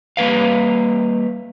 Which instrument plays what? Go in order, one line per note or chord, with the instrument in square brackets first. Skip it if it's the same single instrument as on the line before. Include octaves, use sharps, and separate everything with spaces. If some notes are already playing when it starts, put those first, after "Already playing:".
[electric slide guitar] G3 A#3 B4 F5